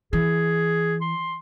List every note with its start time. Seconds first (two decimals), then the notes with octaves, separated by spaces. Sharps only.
0.13 E3 G#4
1.01 C6